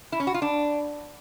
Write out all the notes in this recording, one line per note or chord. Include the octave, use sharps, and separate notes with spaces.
E4
C#4
F#4
F4
D4